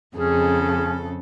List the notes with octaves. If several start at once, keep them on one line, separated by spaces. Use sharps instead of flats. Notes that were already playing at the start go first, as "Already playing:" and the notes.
F2 C#3 C#4 G#4 A4